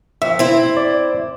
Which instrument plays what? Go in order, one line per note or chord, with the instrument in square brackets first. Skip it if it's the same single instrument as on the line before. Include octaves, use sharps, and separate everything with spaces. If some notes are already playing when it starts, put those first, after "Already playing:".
[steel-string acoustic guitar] F2 [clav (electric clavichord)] E5
[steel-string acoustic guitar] C4 E4 C5
[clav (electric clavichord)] D5